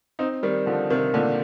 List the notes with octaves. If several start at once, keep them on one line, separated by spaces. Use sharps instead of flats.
C4 D#4
D#3 G3
D3 F3
C3 D#3
A#2 D3